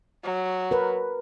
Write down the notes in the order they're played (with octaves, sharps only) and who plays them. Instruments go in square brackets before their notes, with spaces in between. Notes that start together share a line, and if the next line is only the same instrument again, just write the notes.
[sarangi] F#3
[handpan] A#4 B4